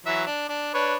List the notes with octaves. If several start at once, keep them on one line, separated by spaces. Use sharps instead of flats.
E3 F#3 E5
D4
D4
D4 B4 C#5